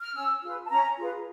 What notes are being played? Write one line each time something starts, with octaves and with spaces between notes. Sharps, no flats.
F6
C#4 E6
F4 G#4 B4
A5
C#4 A#5
F4 G#4 B4